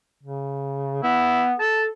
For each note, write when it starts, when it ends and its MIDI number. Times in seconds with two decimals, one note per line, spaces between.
0.23 1.01 49
1.03 1.54 59
1.03 1.44 64
1.59 1.88 69
1.59 1.82 81